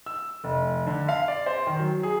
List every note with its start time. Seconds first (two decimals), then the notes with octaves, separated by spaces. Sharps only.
0.06 E6
0.44 F1
0.87 D3
1.09 F5
1.28 D5
1.46 C5
1.67 D#3
1.80 F#3
2.03 G#4